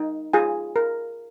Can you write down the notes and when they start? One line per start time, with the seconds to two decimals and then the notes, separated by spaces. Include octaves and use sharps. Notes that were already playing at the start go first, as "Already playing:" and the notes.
Already playing: D#4
0.33 F4 G#4 G#5
0.76 A#4